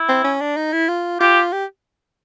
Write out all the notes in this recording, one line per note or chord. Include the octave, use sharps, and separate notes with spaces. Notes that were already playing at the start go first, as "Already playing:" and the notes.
Already playing: E4
C4
C#4
D4
D#4
E4
F4
F4 G4
G4